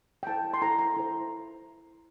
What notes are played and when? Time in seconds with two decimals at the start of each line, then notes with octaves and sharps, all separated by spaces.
0.23 G5
0.27 E4 A4 C5 A5
0.54 C6
0.62 E4 A4 C5 A#5
0.79 A#5
0.96 E4 A4 C5